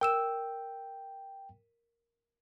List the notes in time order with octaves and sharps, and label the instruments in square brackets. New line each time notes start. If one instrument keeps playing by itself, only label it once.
[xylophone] A#4 E6 E7 [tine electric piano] G5